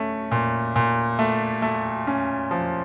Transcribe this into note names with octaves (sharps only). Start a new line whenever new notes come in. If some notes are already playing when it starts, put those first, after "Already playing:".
Already playing: A3 C#4
A#2
A#2
A3
A3
C#4
F3